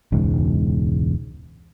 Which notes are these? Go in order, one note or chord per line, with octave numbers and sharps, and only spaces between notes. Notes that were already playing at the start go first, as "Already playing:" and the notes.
E1 C#2 G#2